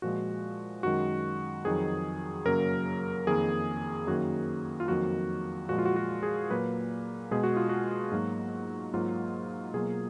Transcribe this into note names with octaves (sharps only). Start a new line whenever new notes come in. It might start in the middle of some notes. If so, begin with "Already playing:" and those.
A#2 F3 G#3 F#4
F#2 D#3 G#3 F#4
F2 D#3 F#3 G#4
F#2 C#3 F#3 A#3 A#4
F2 D#3 A#3 G#4
F#2 D#3 A#3 F#4
F4
F2 D#3 F#3 A#3 F#4
A#2 F3 G#3 F#4
F4
F#4
F#4
G#4
A#2 F#3 A#3 B4
B2 G#3 G#4
F#4
F4
F#4
G#2 F#3 A#3
G#2 F#3 A#3 F4
B2 F#3 A#3 G#4